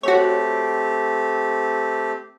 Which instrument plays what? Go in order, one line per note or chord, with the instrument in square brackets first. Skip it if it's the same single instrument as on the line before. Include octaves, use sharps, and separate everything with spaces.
[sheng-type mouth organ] A3 C4 G4 [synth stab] F#4 C#5